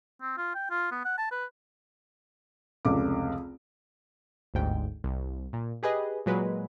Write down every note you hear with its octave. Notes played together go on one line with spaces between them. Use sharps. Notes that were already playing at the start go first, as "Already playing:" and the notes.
C4
F4
G5
F4
B3
F#5
A5
B4
F1 C#2 D6
G1 D2 G#2 G5
C2
A#2
G4 G#4 B4 D#5
A#2 F#3 G#3 B4